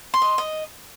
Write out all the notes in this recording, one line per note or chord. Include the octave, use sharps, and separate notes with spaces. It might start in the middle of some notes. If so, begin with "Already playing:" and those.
C6
D#5
D#5